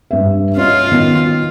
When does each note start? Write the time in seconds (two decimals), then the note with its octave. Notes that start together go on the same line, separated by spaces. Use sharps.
0.11 G2 E5
0.56 C#4 F4 C#5 D#5
0.92 D#3 B3 D#5